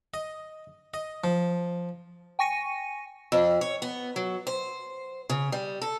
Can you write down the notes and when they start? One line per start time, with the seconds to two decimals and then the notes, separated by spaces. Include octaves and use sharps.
0.14 D#5
0.94 D#5
1.24 F3
2.39 G5 G#5 C#6 A#6 C#7 D#7
3.32 F2
3.61 C#5
3.82 B3
4.16 F#3
4.47 C5
5.29 C#3
5.52 G3
5.82 A4